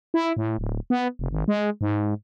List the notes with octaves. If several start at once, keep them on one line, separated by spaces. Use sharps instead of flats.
E4
A2
D1
B3
F1
G#1
G#3
G#2